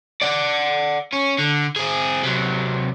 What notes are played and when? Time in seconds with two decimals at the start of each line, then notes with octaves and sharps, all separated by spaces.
0.22 D5 F#5
1.13 C#4
1.39 D3
1.76 C4 G#4
2.23 C3 F#3